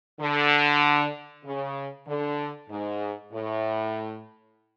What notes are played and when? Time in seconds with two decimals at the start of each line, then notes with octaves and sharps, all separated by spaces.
0.21 D3
1.45 C#3
2.08 D3
2.69 G#2
3.33 A2